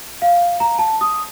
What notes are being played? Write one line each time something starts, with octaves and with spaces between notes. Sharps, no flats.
F5
A#5
A5
D#6